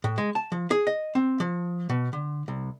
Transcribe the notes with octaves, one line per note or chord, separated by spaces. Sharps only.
A2
G#3
A5
F3
G#4
D#5
C4
F3
B2
D3
C2